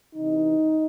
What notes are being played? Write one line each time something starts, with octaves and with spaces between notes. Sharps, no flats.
C3 E3 D#4